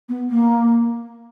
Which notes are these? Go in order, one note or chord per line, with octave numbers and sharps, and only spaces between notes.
B3
A#3